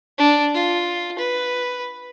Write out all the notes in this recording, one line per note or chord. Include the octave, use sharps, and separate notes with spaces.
D4
F4
B4